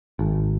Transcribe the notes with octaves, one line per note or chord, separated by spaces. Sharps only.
G#1